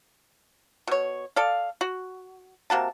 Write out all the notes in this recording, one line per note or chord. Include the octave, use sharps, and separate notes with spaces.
B2 C#5
A4 D5 F5
F#4
C3 A#3 F#4 A5